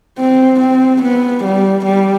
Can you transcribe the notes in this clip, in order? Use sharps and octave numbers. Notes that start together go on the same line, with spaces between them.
C4
C4
B3
G3
G3